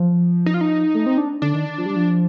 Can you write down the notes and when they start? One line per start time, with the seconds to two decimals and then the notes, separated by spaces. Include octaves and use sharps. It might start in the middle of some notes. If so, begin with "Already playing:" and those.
Already playing: F3
0.46 D#4
0.54 F4
0.61 D#4
0.94 A3
1.06 C4
1.18 D4
1.42 D3 D4
1.54 D#3
1.78 F3
1.86 G3
1.96 F3